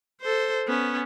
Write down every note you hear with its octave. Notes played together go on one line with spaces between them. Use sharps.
A4 C5
B3 C#4